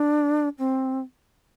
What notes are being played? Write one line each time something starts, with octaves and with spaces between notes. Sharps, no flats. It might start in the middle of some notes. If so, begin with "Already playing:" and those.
Already playing: D4
C4